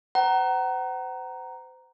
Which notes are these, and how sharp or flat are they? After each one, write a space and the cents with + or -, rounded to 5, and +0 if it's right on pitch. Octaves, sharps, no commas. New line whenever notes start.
C5 -35 F#5 +35 A#5 +0